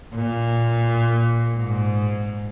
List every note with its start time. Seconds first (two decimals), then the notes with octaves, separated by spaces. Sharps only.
0.15 A#2
1.57 G#2